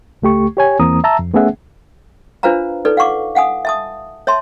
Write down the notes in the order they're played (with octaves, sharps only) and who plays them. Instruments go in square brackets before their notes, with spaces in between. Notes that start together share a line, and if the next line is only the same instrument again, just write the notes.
[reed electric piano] C#2 A3 G4 C#6
G4 C#5 G#5
E2 E3 A#3 C4 A#5 D#6
E5 A5 A#5 E6
F2
A3 B3 C#4 G#4 E5 F#5
[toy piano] D4 F4 B4 C5 F5 A#5
D#4 A4 B4 D5
F5 F#5 C#6 D6
F5 F#5 G#5 D#6
E5 A5 D#6
C#5 E5 A5 C6